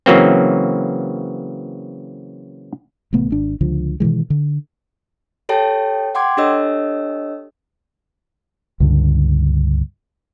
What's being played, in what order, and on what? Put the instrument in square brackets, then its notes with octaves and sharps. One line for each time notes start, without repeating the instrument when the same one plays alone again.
[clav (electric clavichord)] C#3 E3 F#3 A#3 C4
[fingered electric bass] A1 C3 A3 B3
G#1 D4
C#2 D3 F3
B2 D#3 E3 G#3
D3
[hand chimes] G4 A4 C#5 G5 A5
F#5 G5 C6 D6 G#6
D4 G4 A4 C#5 D#5 E6
[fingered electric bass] C#2 G2 D3